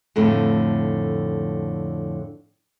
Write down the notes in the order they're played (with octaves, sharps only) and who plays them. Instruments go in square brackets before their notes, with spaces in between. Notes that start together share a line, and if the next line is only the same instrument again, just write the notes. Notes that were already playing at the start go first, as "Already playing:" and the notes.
[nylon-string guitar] F2 A2 D3 A3